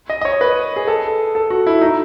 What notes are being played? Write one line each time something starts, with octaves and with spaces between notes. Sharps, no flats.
D#5
D#5
C#5
B4
G#4
A4
A4
F#4
E4
D#4